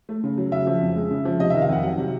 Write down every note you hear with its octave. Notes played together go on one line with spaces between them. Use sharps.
A3
C#3
F#3
C#3 E5
F3
F2
G#3
C#3
F3
C3 D#5
D#3 E5
F5
F2 F#5
F#3 F#5
C3